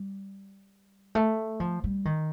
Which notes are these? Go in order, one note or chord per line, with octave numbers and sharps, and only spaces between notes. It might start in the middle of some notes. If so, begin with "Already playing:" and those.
Already playing: G3
A3
F3
G3
D#3